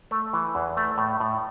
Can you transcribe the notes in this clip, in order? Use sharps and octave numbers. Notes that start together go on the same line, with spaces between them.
A3
E3
E2
A3
A2
A2